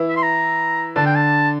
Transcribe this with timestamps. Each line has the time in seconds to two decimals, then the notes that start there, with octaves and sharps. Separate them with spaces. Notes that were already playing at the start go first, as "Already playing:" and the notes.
Already playing: E3 E4
0.09 E5
0.16 C6
0.23 A#5
0.96 D3 D4 A5
1.06 G5
1.16 A5